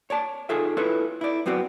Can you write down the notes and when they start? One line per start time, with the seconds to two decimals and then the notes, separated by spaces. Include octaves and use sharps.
0.10 C#5 D5 A5
0.49 D#4 F4 G#4 A4 E5
0.77 E4 F4 A4 B4 C#5
1.21 E4 D5
1.46 F#2 B3 C4 F#4 D5